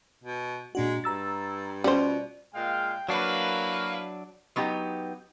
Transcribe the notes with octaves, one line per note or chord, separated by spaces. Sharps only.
B2
A#2 G#3 D4 F#4
G2 A#5 E6 A6
B2 G3 C#4 F4 C5
A#2 G#3 F5 G5
F#3 A#3 D4 E4 F#4 B4 F5
F#3 B3 D#4 G4